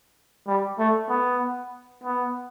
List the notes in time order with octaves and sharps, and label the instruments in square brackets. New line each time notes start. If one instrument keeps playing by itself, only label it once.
[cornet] G3
A3
B3
B3